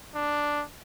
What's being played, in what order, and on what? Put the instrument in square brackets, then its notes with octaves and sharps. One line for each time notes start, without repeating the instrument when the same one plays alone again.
[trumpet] D4